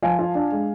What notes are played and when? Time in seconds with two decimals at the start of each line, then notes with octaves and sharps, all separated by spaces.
0.02 F3 F5 G#5
0.19 F4
0.35 D4
0.52 G#3